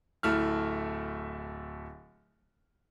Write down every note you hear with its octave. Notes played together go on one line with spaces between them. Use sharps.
D1 A3 E4 F6